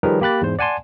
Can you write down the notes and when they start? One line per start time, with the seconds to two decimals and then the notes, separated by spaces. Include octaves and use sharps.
0.03 D#3 F3 G3 G#4 A#4 B4
0.21 A#3 G4 B5 F#6 A6
0.41 E2 G#2 C5
0.59 D5 F#5 G#5 A5 C6